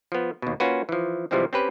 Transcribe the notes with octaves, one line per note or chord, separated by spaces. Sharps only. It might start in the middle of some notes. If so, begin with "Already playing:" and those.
F3 B3
D#2 B2
A#3 C#4 F4 F#4 B4
E3 F3
C3 E3 F3 G3 G#3 C4
C4 C#4 G4 B4